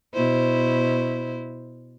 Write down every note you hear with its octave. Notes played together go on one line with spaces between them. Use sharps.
B2 E4 C5